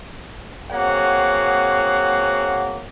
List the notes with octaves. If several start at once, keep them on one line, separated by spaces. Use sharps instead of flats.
A#3 C4 F#4 G#4 C#5 F#5